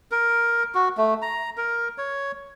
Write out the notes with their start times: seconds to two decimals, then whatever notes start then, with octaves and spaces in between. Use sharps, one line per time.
0.12 A#4
0.75 F#4
0.97 A3
1.22 A#5
1.57 A#4
1.98 C#5